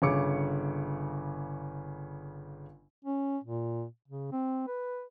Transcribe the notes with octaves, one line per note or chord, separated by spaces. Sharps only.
G1 C#3 C#5 D6 C#7
C#4
A#2
C#3
C4
B4